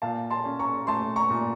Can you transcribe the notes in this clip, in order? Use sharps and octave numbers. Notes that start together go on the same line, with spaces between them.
A#2 F5 A5
A5 C6
C#4
A#5 C#6
A3 A5 C6
A#5 C#6
A#2